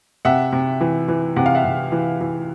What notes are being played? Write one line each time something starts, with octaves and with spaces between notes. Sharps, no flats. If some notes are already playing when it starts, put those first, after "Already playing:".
C3 E5 F#5
C3
E3
E3
C3 F#5
F5
E5 F#5
C3
E3
E3